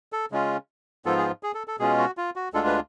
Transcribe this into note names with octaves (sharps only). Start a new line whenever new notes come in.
A4
C#3 G#3 C#4 F4
G#2 F3 B3 F4 A4
G#4
G#4
A4
A4
B2 G#3 C#4 F4 G#4
F#4
F4
F#4
D2 D3 G#3 D4 F4 A4
B4